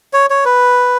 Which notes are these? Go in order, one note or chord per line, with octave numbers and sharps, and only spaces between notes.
C#5
C#5
B4